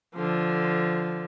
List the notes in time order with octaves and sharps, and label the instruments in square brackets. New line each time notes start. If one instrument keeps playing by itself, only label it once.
[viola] D3 F3